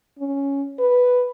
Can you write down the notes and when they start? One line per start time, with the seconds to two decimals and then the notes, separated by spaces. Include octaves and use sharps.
0.19 C#4
0.79 B4